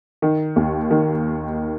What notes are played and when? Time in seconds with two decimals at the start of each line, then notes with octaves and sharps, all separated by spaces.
0.22 D#3
0.56 D#2
0.91 D#3